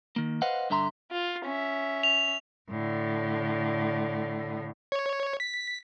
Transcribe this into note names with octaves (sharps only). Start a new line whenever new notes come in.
D#3 A#3
B4 C5 D#5 F5 F#5
G2 D3 E5 A#5 C6
F4
C#4 E5
F7
A2 D3
C#5
B6